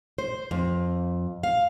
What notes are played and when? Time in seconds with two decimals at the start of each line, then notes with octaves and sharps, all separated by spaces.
0.18 C5
0.51 F2
1.43 F5